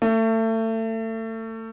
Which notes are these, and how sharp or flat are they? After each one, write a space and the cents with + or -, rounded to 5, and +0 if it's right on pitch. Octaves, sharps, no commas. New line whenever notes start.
A3 +30